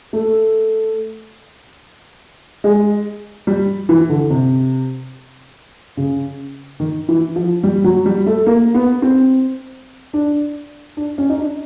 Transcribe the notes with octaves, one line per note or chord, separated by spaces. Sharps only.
A3
G#3
G3
E3
D3
C3
C#3
D#3
E3
F3
G3
F#3
G3
A3
A#3
B3
C4
D4
D4
C#4
D#4
D4